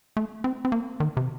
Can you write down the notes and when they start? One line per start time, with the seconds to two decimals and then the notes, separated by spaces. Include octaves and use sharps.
0.17 A3
0.44 C4
0.65 C4
0.72 A#3
1.00 D#3
1.17 C3